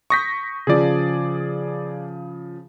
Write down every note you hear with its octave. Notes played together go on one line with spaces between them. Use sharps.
C#6 D#6 G6 A#6 B6
C#3 F3 G#4 D5